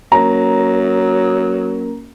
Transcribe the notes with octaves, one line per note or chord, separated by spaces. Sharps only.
F#3 A#3 C#4 A#4 A#5